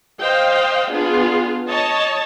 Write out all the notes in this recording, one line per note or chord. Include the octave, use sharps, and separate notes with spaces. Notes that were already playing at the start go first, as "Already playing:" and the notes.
C5 D#5 F5 G5
B3 D4 F4 G#4
C#5 D#5 A5